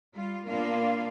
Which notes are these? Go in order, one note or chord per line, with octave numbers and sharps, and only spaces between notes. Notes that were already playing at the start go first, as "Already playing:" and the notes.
G3 F4
A#2 A#3 B3 D4 F4 F5